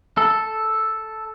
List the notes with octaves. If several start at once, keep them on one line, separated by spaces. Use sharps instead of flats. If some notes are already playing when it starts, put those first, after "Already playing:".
A4